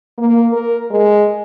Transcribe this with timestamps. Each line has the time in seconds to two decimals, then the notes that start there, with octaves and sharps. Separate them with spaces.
0.18 A#3
0.52 A#4
0.91 G#3